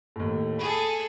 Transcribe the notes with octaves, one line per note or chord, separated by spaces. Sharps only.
D#2 A2
G#4 A4 B5